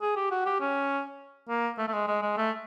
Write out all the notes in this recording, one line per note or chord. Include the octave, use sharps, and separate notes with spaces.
G#4
G4
F#4
G4
C#4
A#3
A3
A3
G#3
G#3
G#3
A3